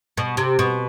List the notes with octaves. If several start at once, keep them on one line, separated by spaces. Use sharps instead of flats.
B2
C3
B2